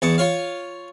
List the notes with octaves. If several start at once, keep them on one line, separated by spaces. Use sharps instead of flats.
E2 A5 C#6 D#6
F4 C#5 F5